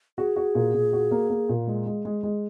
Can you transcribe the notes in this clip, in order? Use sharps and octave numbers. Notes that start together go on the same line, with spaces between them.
F#4 G#4
F#4
A#2
A#2
F#4
A#3
A#3
A#2
G#3
G#3
G#3
G#3